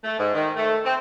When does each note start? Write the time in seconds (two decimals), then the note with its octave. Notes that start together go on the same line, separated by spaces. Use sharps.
0.04 A3
0.19 G#2
0.34 D#3
0.56 A3
0.85 C4